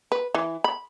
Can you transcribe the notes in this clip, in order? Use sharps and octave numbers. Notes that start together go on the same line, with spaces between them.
B4
E3
B5